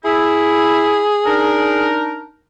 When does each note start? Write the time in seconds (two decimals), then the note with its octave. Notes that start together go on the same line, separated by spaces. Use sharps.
0.05 E4 G#4
1.26 D4 D#4 A#4